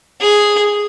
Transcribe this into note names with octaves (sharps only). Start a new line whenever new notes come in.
G#4